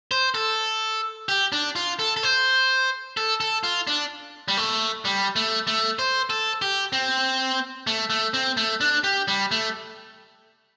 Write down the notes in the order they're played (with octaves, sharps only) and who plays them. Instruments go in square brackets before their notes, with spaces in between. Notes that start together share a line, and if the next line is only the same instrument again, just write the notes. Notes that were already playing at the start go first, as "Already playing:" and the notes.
[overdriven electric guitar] C5
A4
G4
D4
F4
A4
A4
C5
A4
A4
F4
D4
G3
A3
G3
A3
A3
C5
A4
G4
C4
A3
A3
C4
A3
D4
G4
G3
A3